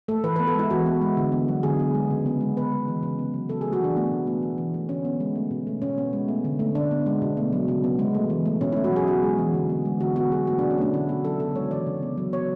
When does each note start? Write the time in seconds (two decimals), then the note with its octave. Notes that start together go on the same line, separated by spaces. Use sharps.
0.08 A3 A4
0.24 E3 B4
0.36 B3 B4
0.47 A4
0.55 G#3 E4
0.70 E3 F#4
0.86 B3
1.01 G#3
1.17 D3
1.32 B3
1.48 F#3
1.63 D3 G#4
1.79 B3
1.94 G#3
2.10 C#3
2.26 B3
2.41 G#3
2.57 B3 B4
2.72 G#3
2.88 E3
3.03 C#3
3.19 B3
3.34 F#3
3.49 C#3 A4
3.61 A3 G#4
3.73 F#4
3.81 E3 D4
3.96 A3 B3
4.11 B2
4.27 A3
4.42 A3
4.58 E3
4.74 A3
4.89 D3 C#4
5.05 B3
5.20 G#3
5.35 A3
5.51 B2
5.67 A3
5.82 B2 C#4
5.98 B3
6.13 G#3
6.28 A3
6.44 D3
6.59 A3
6.75 D3 D4
6.91 B3
7.06 G#3
7.22 B2
7.37 A3
7.52 F#3
7.68 C#3
7.84 B3
7.99 G#3
8.14 A3
8.30 E3
8.46 A3
8.61 B2 C#4
8.72 A3 E4
8.84 F#4
8.92 F#3 G#4
9.08 B3 F#4
9.24 G#3
9.38 E3
9.54 D3
9.70 B3
9.85 G#3
10.00 D3 F#4
10.16 B3 F#4
10.32 F#3 G#4
10.47 A3 F#4
10.58 B2 D4
10.70 C#4
10.78 A3 D4
10.93 D3 E4
11.09 B3 F#4
11.24 F#3 A4
11.40 C#3 A4
11.56 G#3 C#5
11.71 E3 D5
11.86 C#3
12.02 B3
12.17 F#3
12.33 B3 C#5